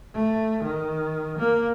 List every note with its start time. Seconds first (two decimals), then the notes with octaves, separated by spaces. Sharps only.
0.14 A3
0.63 D#3
1.38 A#3